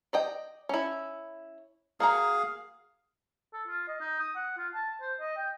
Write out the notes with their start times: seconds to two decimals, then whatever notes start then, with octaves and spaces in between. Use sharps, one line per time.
0.13 D5 D#5 G5
0.69 C#4 E4
2.00 A#3 F#4 G#4 F5 A#5
3.53 A4
3.68 F4
3.88 D#5
4.00 D#4
4.20 D#6
4.36 F#5
4.58 F4
4.75 A5
5.02 C5
5.20 D#5
5.37 G5